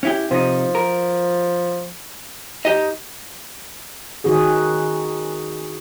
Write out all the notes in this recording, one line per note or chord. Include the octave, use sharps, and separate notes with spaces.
C#4 E4 G4
C3 F3 D#4
A#4
D#4 G4 D#5
D#3 C#4 F#4 G#4